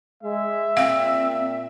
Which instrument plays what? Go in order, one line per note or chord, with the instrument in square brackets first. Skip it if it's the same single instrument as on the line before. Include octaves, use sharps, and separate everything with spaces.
[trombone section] G#3 [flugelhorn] E5
[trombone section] A#2 [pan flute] C4 [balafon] F5